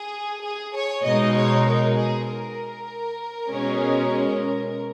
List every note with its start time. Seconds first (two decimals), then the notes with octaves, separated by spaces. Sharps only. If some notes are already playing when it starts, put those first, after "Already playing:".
Already playing: G#4
0.43 G#4
0.74 C#5
1.05 B2 G#3 D#4 D#5
1.35 C#5
1.66 A#4
1.97 G#4
2.27 A#4
3.50 B2 G#3 C#4